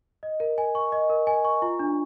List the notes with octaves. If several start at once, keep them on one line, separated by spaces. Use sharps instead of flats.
D#5
A#4
G#5
C#6
D#5
A#4
G#5
C#6
F4
D4